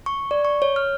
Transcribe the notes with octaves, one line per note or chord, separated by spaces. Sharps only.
C#6
D5
C#6
C#5
F6